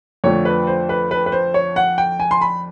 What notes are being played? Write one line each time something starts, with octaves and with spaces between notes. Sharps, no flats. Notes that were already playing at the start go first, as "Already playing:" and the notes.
F2 D3 F3 A3 C#5
B4
C5
B4
B4
B4
C5
C#5
F#5
G5
G#5
C6
B5